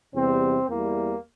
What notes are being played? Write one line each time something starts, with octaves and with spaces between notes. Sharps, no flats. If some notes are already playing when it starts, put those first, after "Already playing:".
E2 C3 G3 C4
E2 E3 G3 A#3